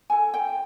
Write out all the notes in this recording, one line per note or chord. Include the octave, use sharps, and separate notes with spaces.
F4 A4 G#5
G5